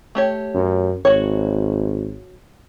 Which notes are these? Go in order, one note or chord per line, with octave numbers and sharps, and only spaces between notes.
A3 G4 C#5
F#2
G#1 F#4 C#5